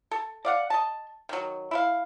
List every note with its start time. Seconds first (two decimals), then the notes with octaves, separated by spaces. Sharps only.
0.11 A4
0.45 D5 F5 F#5
0.70 D#5 A5
1.29 D#3 F#3
1.71 E4 B4 F5